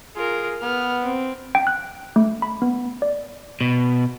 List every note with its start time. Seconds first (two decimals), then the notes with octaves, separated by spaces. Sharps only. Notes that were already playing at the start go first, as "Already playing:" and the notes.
0.16 F4 G#4 A#4
0.62 B3 F6
1.03 C4
1.55 G5
1.67 F#6
2.16 A3
2.42 B5
2.62 B3
3.02 D5
3.61 B2